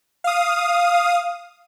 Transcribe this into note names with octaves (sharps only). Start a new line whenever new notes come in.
F5 D#6